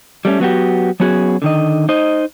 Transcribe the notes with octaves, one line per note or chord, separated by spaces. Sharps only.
G3 A3 B3 C#4
F#3 B3 F#4 G4
F#3 B3 C#4 F#4 G#4
D3 D#3 D#5
D#4 C5 D#5